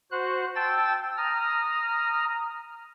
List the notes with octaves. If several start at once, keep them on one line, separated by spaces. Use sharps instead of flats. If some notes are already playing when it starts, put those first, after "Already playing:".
F#4 C5 F#6
G5 A5 E6 A6
A#5 D#6 F6